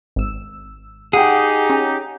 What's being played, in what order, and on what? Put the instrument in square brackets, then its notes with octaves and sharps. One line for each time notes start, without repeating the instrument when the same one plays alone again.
[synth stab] G#1 E6
[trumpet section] D#4 G4 [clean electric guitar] G#4 [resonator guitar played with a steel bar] F#5 G5
[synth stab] C#4 [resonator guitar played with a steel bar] G#5